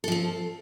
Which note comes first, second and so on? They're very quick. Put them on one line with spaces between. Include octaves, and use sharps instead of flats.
A4 F3 C4